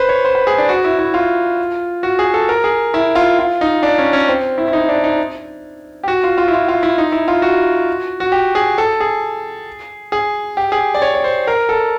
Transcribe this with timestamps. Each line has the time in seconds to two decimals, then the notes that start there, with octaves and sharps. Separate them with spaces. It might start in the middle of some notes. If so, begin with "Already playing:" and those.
Already playing: B4 C5
0.09 C#5
0.25 C5
0.35 B4
0.47 G#4
0.58 D4
0.69 F#4
0.84 E4
0.98 E4
1.14 F4
2.03 F#4
2.19 G#4
2.34 A4
2.49 A#4
2.64 G#4
2.94 E4
3.15 F4
3.39 F4
3.61 D#4
3.83 D4
3.98 C#4
4.13 C#4
4.28 C4
4.58 E4
4.68 E4
4.73 D#4
4.89 D4
5.04 D#4
6.04 G4
6.08 F#4
6.23 F4
6.38 F4
6.48 E4
6.53 F4
6.68 F4
6.83 E4
6.98 D#4
7.12 E4
7.28 F4
7.42 F#4
8.20 F#4
8.32 G4
8.55 G#4
8.78 A4
9.00 G#4
10.12 G#4
10.57 G4
10.72 G#4
10.94 D5
11.02 C#5
11.14 C#5
11.24 C5
11.47 A#4
11.69 A4